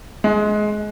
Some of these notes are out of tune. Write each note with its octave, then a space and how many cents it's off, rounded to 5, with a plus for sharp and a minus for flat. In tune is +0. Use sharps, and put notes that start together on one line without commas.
G#3 +20